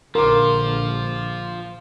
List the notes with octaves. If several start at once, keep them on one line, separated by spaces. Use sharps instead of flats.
A#1 D3 F3 F4 A#4 C6 D6